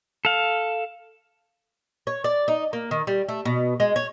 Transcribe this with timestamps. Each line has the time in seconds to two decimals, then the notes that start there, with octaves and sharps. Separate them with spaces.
0.25 A4 F5
2.07 C#5
2.24 D5
2.48 D#4
2.73 A#3
2.91 D#3
3.07 G3
3.28 A3
3.45 B2
3.80 G#3
3.96 C#5